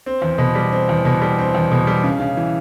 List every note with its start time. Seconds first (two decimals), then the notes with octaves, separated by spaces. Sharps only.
0.06 C4
0.22 E2
0.38 B2
0.55 G3
0.72 C4
0.89 E2
1.05 B2
1.22 G3
1.38 C4
1.55 E2
1.71 B2
1.87 G3
2.03 C#3
2.20 C#3
2.37 E3